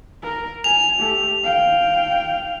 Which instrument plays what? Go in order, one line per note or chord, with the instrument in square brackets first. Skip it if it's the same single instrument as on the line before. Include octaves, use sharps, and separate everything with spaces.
[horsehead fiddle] A#4
[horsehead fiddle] G#5 [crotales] F7
[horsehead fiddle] A3 G4
F5 G5